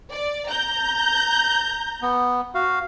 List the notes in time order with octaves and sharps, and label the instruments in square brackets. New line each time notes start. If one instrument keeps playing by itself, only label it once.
[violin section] D5
A#5 G6
[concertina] B3
F#4 F5